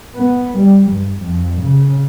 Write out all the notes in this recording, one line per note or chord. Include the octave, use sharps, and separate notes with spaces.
B3
G3
G2
F2
C#3